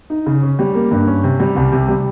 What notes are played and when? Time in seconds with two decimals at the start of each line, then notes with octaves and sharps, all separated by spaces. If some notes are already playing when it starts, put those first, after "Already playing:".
0.10 D#4
0.26 C#3
0.42 C#4
0.59 G3
0.75 A#3
0.91 G2
1.07 C#4
1.23 C3
1.40 G3
1.56 C2
1.72 C3
1.88 G3